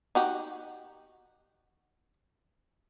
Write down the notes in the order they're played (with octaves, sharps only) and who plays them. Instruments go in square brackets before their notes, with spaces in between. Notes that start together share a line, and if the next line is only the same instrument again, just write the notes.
[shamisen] D#4 F#4 G4